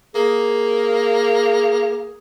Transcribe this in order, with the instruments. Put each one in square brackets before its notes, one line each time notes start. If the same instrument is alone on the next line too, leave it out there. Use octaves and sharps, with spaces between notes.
[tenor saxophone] A#3 [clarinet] G#4